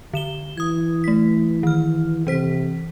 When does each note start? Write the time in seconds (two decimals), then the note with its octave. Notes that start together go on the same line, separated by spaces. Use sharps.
0.14 D3 E7 G7
0.57 E3 D#6 G#6
1.04 A3 B6
1.63 D#3 F6
2.27 C3 E3 C5 B6